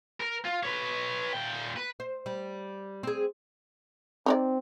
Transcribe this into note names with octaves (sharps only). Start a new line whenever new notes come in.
A#4
F4
B4 C#5
A#2 G5
B4
C5
G3
C4 G#4
C4 D#4 C#5 D5